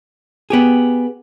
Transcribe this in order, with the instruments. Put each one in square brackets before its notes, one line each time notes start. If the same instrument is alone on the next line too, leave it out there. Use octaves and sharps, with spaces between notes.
[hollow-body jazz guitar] B3 G4 G#4